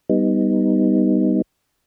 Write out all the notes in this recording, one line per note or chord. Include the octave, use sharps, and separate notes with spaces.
G3 B3 D#4